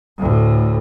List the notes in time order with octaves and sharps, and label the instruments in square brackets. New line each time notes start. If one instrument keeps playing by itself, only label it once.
[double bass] D2 A2